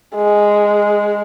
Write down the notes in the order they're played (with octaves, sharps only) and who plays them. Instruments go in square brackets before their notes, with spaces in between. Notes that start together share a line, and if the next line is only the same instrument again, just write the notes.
[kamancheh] G#3